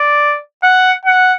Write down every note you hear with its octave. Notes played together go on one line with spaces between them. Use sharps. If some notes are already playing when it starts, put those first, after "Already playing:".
Already playing: D5
F#5
F#5